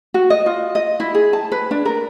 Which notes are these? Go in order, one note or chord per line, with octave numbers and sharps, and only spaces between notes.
F#4
D#5
F4
D#5
E4
G#4
A5
B4
D4
A#4